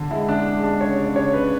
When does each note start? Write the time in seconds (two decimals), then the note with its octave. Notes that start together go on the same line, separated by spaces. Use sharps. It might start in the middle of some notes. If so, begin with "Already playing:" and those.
Already playing: D3
0.11 G#3 E4
0.29 D4
0.34 G#3
0.57 G#3
0.63 D4
0.81 C#3 C#5
0.98 D5
1.04 C#3
1.16 C#5
1.28 C#3
1.33 B4